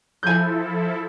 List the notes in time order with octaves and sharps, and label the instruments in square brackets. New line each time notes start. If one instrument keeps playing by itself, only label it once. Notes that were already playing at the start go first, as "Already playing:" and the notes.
[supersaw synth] F3 E4 A4 [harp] G#5 G6